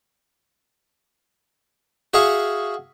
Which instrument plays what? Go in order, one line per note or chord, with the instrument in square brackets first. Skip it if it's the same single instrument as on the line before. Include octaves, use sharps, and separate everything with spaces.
[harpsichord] F#4 G#4 E5 F5 C#6